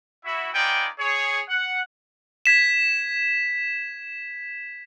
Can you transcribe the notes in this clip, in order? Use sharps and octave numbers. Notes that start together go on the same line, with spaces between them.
E4 F#4 E5
B3 D#4 F4 D5 G5 G#5
G#4 C#5
F#5
G#6 B6 E7